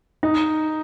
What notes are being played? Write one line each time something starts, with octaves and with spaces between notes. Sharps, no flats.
D#4